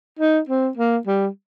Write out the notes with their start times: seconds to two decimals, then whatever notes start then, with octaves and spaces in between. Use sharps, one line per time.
0.19 D#4
0.49 C4
0.77 A#3
1.07 G3